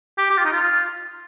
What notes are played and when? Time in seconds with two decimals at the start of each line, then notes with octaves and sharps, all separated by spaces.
0.18 G4
0.30 G4
0.38 F4
0.45 D#4
0.52 F4